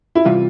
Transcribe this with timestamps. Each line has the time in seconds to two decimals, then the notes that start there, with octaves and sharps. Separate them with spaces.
0.15 E4
0.25 C3 E3 G3 F4